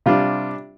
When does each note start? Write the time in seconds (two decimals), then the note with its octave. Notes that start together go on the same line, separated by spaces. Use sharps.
0.06 C3 G3 D4 F4